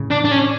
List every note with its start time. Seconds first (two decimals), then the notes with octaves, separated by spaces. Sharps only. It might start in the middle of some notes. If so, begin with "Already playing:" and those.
Already playing: A2 C#3
0.11 D4
0.25 D4
0.31 C#4